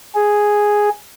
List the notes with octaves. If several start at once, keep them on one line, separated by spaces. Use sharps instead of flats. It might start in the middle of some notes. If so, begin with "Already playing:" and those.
G#4